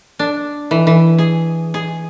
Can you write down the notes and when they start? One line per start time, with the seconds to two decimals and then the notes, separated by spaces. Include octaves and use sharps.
0.19 D4
0.71 E3
0.87 E3
1.18 G#4
1.74 G#4